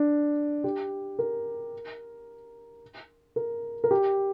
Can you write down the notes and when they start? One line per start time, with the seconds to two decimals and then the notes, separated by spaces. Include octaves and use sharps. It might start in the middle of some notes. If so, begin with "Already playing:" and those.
Already playing: D4
0.64 G4
1.19 A#4
3.36 A#4
3.84 A#4
3.91 G4